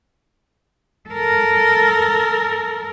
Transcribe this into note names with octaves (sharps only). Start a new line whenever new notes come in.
A4 A#4